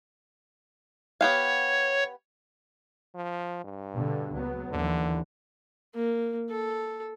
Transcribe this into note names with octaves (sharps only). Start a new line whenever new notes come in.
B3 G4 C#5 F5
F3
G2
B2 D3
C#2 F#3 B3
D#2 D3 E3
A#3
A4